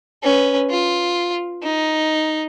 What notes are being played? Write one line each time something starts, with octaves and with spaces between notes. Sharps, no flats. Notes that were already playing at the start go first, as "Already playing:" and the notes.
C#4 B4
F4
D#4